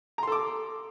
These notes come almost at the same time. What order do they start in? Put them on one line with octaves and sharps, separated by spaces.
A#5 C6 A4 D6